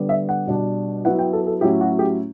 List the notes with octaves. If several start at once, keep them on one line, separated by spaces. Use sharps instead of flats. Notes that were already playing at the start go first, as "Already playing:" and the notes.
Already playing: D3 G3 B3
E5
F#5
B2 G3 D4
F#3 B3 E4 F#5
G5
A4
A4
A2 F#3 C#4 E4 G4
F#4
G4